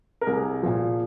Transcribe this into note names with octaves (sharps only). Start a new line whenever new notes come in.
A#4
C2 G#4
A#2 F3